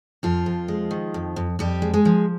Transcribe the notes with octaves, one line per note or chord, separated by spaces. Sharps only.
F2 F3 F4
F2
G#3
D#3
F2
F2
F2 G3 G4
G#3
G#3 G#4
F3